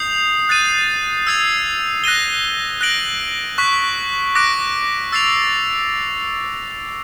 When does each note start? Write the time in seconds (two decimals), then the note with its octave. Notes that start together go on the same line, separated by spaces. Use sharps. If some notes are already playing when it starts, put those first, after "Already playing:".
Already playing: D#6 G6 C7 F7
0.49 F#6 A6 C7 D#7
1.27 E6 G#6 C7 F7
2.04 F#6 A#6 D#7 G7
2.81 F#6 A#6 D7 F#7
3.58 C#6 F#6 B6
4.35 D6 F#6 A#6 D7
5.12 E6 A6 C7 F7